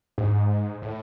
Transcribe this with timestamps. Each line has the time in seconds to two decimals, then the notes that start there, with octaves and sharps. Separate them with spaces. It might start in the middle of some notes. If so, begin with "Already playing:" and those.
0.18 G#2
0.82 A2